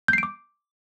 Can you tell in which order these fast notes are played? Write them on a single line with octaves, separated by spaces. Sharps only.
G6 C7 D7 D6